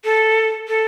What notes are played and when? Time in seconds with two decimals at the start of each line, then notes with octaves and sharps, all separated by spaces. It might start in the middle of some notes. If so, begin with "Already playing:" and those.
0.04 A4
0.68 A4